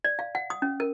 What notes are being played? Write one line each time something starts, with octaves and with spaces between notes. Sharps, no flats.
D5
F5
F#5
D#6
C#4
A#4